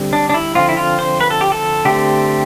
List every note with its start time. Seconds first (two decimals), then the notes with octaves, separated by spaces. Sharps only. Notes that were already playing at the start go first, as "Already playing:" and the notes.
Already playing: D3 G3 C4
0.13 D4
0.29 D4
0.34 E4
0.55 D3 F3 C4 F4
0.69 E4
0.77 F4
0.99 C5
1.21 B4
1.30 A4
1.41 G4
1.52 A4
1.85 D3 A3 C4 G4